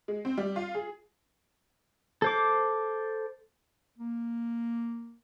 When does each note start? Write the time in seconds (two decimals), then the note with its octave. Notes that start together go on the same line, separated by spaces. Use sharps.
0.08 G#3
0.25 C4
0.38 G3
0.56 F4
0.75 G#4
2.22 A4 C5 D6
3.98 A#3